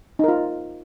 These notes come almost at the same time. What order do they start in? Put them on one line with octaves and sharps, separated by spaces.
D#4 A#4 F4